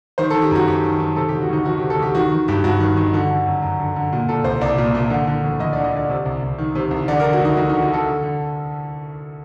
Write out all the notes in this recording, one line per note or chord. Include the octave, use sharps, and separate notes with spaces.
D#3 C5
D#3 A4
G4
F#2 F#4
F#2 G4
D#3
D#3
C3 A4
D2 G4
F#4
D2 D#4
D#3 F#4
C3 G4
A4
D2 G4
D#3 F#4
D#3
G2 G4
G2 F#4
D#3
D#3 D#4
D3 F#4
D3
F#2
F#2
D3
D3
A#2
A#2 A4
C2 C5
C2 D5
A#2
A#2
D3
D3
D2
D2 D#5
D3 D5
D#5
D3 D5
C3
C2
C2
D#3
C3
C2
D3 D5
D3 A#4
F#4
D2 D#4
D2 F#4
D3 D#4
F#4
D3 A4
D3
D3